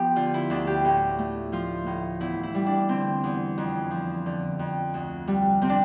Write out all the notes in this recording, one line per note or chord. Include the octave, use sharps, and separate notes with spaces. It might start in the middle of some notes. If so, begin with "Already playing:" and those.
Already playing: F3 B3 G4
D3 F4
E4
D2 D4
G4
A2
A3
F3 F4
A2
E2 E4
E4
G3
D4
D3 C4
E2
F2
F3
D3
F2
D2
G3
C3 C4
D4